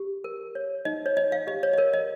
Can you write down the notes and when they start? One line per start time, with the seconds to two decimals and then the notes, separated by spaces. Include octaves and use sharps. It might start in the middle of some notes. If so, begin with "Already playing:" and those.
Already playing: G4
0.24 A#4
0.55 C#5
0.85 D#4 D#5
1.06 C#5
1.16 C#5 D#5
1.32 F5
1.47 G4 D#5
1.63 C#5
1.73 D#5
1.78 A#4 C#5
1.93 D#5